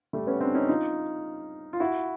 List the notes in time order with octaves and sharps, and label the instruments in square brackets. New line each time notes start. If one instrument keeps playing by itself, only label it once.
[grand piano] G3 A3
B3 C#4
C4 D4
C#4 D#4
D#4 F4
F4
E4 F#4